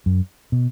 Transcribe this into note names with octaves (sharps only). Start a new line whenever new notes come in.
F#2
B2